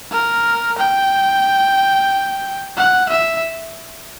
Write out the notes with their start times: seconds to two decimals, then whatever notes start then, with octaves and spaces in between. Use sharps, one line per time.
0.12 A#4
0.78 G5
2.76 F#5
3.09 E5